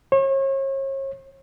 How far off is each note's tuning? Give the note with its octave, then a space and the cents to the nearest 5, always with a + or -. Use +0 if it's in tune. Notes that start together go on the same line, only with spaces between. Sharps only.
C#5 -40